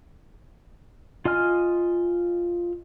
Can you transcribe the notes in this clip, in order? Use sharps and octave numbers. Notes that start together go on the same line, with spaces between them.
F4 D#5 G#5 F6